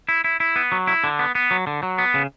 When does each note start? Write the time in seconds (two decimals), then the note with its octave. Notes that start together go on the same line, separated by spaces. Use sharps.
0.09 E4
0.24 E4
0.40 E4
0.56 B3
0.72 F#3
0.87 E4
1.04 D3
1.19 B3
1.35 B3
1.51 F#3
1.67 D3
1.83 F#3
1.98 B3
2.14 C#3